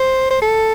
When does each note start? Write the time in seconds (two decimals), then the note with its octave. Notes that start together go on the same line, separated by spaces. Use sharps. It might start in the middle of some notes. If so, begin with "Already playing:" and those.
Already playing: C5
0.30 C5
0.42 A4